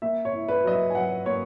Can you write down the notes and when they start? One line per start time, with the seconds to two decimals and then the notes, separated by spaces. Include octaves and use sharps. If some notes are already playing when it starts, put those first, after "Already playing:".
0.02 A#3 E5
0.25 C#5
0.33 E4
0.48 B4
0.64 F#3 D#5
0.72 E5
0.90 G#5
0.95 F#3 F#5
1.26 A#3 C#5